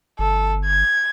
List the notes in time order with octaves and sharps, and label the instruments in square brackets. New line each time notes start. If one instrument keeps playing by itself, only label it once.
[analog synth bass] G1 [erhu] A4
[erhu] G#6